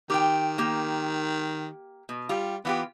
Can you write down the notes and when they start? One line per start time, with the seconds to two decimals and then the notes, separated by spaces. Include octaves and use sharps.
0.10 D#3 G4 G5
0.58 A#3 G4
2.09 B2
2.29 G3 F4 G4
2.65 E3 B3 F4 G4